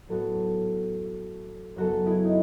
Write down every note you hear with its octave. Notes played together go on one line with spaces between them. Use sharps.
A2 F#3 B3 F#4 A4
F#2 C#3 F#3 B3 F#4 A4
E4 G#4
D#4